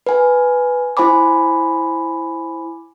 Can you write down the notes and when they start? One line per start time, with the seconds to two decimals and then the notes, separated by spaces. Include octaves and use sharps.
0.06 B4 G#5
0.97 E4 C5 G#5 B5 D6